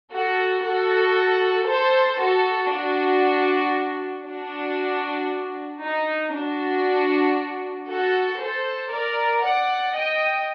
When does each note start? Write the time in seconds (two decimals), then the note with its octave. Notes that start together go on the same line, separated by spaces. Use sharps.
0.13 F#4 A4
0.64 F#4 A4
1.68 A4 C5
2.19 F#4 A4
2.71 D4 F#4
4.26 D4 F#4
5.81 D#4
6.33 D4 F#4
7.88 F#4 A4
8.40 A4 C5
8.91 A#4 D5
9.43 D5 F#5
9.95 D#5 G5